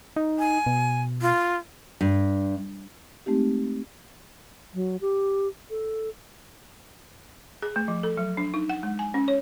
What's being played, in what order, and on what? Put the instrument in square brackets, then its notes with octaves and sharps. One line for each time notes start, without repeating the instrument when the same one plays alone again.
[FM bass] D#4
[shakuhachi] G#5
[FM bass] B2
[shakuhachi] F4
[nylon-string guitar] G2
[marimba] G#3 A3 C4 D#4 G4
[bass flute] F#3
G4
A4
[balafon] G#4
A3
F3
A4
F#3
D4
D#4
F#5
G#3
G#5
C#4
C#5